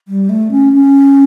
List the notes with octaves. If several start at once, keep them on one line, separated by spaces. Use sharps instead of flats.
G3
A3
C#4
C#4